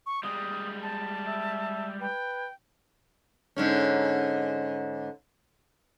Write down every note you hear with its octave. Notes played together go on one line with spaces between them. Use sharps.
C#6
G3 G#3 D#6
A5
E5
B4 G5
G#2 D3 C#4